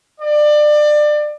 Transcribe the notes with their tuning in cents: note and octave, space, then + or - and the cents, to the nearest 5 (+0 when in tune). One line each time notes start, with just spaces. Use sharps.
D5 +25